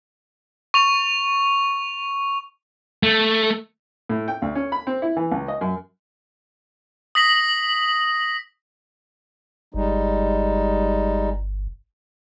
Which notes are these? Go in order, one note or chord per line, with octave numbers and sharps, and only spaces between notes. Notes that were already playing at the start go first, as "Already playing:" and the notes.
C#6 F7
A3
A2
G5
D2
C#4
B5
C4
E4
E3
C#2
D#5
F#2
D#6 A#6 B6 F#7
G1 G3 G#3 D#4